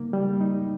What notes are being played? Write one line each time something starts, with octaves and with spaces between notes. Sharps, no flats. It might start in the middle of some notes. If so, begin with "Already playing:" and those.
Already playing: C#3 G3 A#3 D#4
G3
D#4